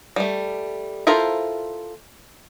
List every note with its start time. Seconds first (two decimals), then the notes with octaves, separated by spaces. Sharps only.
0.16 G3 A3
1.07 E4 F4 A4 A#4 C5